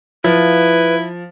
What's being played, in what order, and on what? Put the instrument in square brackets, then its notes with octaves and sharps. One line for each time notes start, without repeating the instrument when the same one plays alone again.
[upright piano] F3 [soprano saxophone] E4 [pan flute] B4